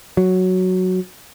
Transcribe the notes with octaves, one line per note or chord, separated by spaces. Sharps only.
F#3